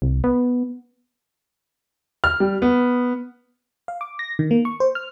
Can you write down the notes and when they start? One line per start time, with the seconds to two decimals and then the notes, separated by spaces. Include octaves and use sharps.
0.02 C2
0.24 B3
2.24 F6
2.40 G3
2.62 B3
3.88 F5
4.01 D6
4.19 A#6
4.39 D#3
4.51 A#3
4.65 C#6
4.80 C5
4.95 F6